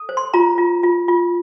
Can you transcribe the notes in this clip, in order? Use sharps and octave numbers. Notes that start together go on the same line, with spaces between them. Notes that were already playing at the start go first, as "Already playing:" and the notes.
Already playing: A4
C5
C6
F4 A#5
F4
F4
F4